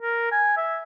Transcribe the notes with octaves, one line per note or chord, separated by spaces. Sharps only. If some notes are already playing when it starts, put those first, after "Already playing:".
A#4
G#5
E5